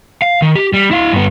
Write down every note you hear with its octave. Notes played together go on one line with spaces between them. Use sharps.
F5
D#3
G4
G3
E4 F5
G2 B3